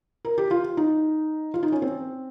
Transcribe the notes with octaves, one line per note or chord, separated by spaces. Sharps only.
A#4
G4
F4
D#4
F4
D#4
C#4
C4